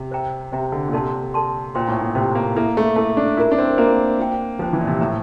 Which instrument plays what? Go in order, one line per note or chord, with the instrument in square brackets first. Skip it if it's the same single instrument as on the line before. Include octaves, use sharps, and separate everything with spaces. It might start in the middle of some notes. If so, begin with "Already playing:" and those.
Already playing: [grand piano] C3
[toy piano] C5 E5 G5 A#5
[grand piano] C3 [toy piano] C5 E5 G5 A#5
[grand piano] D3
A#2
[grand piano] C3 [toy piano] A4 D5 A5 C6
[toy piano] A4 D5 A5 C6
[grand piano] A#2 [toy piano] C5 G5 C6
[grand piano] A2
A2
[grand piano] C3 [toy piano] C5 G5 C6
[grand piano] A#3
[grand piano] A#3 [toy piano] E4 A4 E5
[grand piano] A3
[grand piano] A3 [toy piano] E4 A4 E5
[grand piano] D4
[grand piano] E4 [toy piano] F4 A#4 E5 A#5
[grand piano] D4
C4
[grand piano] A#3 [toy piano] F4 A#4 E5 A#5
[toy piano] F4 C5 G5
[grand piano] F3 [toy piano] F4 C5 G5
[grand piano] E3
A#2
C3
[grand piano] A2 [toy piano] C5 E5 A#5